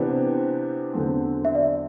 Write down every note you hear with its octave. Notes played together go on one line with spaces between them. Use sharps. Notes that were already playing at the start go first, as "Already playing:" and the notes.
Already playing: C3 E3 B3 D4 G4 C5
E2 D3 F#3 C4
E5
D5